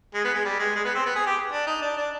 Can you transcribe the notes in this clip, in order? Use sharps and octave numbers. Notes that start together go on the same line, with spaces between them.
G#3
B3
G#3
G3
G#3
G#3
B3
C4
B3
G#4
G4
D4
D#4
D4
D4